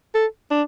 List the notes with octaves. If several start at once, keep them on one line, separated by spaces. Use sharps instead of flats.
A4
D4